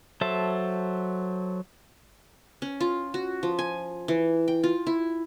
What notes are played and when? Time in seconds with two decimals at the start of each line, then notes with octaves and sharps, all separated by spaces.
0.21 F#3 A4 C5 E5 A5
2.62 C#4
2.80 F4
3.14 F#4
3.43 F3
3.59 G#5
4.08 E3
4.48 G5
4.64 F4
4.87 E4